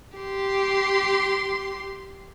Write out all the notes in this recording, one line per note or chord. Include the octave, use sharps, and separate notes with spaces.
G4 C6